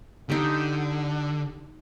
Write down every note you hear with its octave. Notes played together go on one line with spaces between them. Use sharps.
D3 D#4 G4